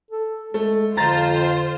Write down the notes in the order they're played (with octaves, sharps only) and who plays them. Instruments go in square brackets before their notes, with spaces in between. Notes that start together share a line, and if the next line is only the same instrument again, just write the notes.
[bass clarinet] A4
[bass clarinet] G#3 [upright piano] A3
[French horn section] F2 [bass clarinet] D3 [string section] F4 C5 [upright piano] A#5 A6